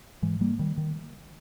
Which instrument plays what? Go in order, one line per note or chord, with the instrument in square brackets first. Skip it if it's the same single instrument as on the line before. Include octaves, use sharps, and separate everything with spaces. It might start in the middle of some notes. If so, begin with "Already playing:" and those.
[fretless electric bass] G#2 E3 G#3
G3 A#3
D#3 G3
D#3